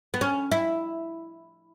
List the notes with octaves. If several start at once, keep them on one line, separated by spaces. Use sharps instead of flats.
B3
C#4
E4